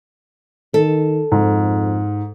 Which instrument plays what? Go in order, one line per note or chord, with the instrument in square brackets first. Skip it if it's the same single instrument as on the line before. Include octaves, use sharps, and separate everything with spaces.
[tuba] D#3 [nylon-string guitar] A4
[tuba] F2 [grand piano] G#2